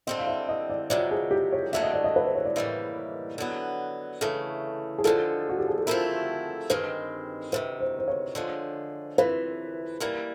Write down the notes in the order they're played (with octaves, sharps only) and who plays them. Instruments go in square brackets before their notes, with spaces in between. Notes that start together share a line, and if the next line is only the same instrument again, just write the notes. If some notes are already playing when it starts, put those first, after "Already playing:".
[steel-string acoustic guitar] D3 G3 C4 [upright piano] D#5
[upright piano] F5
E5
D#5
D5
[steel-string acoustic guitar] F2 C3 D#3 F#3 [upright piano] D5
[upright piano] G#4
G4
C#5
[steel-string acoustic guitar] D#2 D3 F#3 A3 [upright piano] E5
[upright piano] D#5
D5
D#5
B4
C5
C#5
D5
[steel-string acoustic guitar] A2 E3 G3 A#3 [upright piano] D#5
[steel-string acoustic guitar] D3 F#3 B3
[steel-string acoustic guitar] C#3 E3 A3 [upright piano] A4
[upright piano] G#4
[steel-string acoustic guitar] D#2 D3 F3 G#3 [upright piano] A4
[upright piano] F#4
G4
G#4
A4
[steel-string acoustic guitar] F3 A3 C4 E4 [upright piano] A#4
[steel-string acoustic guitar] G2 D#3 G#3 C4 [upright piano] B4
[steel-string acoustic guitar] D2 C3 D#3 [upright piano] B4
[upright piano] C5
C5
C#5
[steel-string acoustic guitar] D3 F3 G#3
[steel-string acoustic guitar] F2 C3 E3 [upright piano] B4
[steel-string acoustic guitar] E3 G3 A#3 [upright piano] A#4